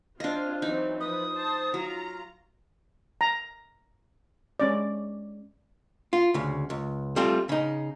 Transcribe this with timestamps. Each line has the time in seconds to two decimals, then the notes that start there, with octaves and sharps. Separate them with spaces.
0.20 C4 D4 F4 D#5
0.62 E3 F#3 C4 D#4
1.00 F3 B4 D#6
1.33 C5 A5
1.74 F#3 F4 A#5
3.21 A#5
4.60 G#3 C#4 D5
6.13 F4
6.34 D2 C#3
6.70 C#2
7.16 G3 A3 C4 F4
7.49 C#3 D#4